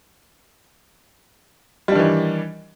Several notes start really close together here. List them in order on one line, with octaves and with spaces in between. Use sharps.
G3 D4 D#3 E3